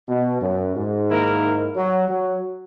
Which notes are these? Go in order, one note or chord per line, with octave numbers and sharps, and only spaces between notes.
B2
F#2
G#2
D#3 A#3 E4 A#4
F#3
F#3